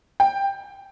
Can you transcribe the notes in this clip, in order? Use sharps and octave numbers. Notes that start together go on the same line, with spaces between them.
G5